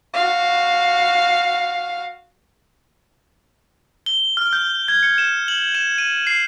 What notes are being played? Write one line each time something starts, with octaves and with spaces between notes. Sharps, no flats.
F#4 F5
G7
F6
G6
G#6
C#7
E7
F#7
E7
D#7
C7